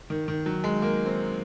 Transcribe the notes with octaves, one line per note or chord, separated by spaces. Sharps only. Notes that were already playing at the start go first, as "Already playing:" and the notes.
D#3
D#3
F#3
G#3
A#3
C4